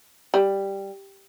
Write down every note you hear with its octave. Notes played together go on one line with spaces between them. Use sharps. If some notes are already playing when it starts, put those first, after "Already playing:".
G3